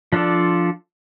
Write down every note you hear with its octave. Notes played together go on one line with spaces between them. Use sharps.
F3 D4 F4 A4 D5